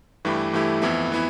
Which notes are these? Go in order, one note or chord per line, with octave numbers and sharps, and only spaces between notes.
G2 E3 A3 E4 G4
G2 E3 A3 E4 G4
F2 E3 B3 E4
E3 B3 E4